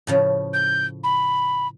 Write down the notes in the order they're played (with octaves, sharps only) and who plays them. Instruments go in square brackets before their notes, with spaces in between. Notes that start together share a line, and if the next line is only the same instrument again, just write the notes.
[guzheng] A2 C#3 F3
[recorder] G6
B5